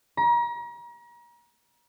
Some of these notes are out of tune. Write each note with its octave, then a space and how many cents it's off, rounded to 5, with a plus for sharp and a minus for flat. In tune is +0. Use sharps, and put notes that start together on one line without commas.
A#5 +35